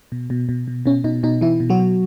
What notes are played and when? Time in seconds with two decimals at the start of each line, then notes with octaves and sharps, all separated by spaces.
0.12 B2
0.30 B2
0.49 B2
0.68 B2
0.86 B2 C#4
1.04 B2 D#4
1.23 B2 D#4
1.41 B2 E3 E4
1.60 B2
1.70 F#3 F#4
1.79 B2